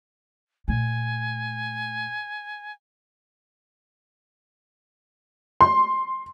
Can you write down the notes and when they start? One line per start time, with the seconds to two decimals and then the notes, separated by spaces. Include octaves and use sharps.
0.68 A#2 A3 G#5
5.61 C6